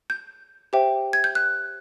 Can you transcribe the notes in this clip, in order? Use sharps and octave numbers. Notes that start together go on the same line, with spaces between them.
G6
G4 C5 E5 G5
G#6
G6
F#6